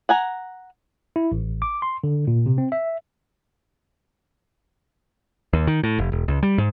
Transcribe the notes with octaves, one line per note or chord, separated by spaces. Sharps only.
F#5 G#5 A#5
E4
A1
D6
C6
D3
A#2
C3
C4
E5
D#2
D#3
A2
F1
E1
C#2
G3
G#2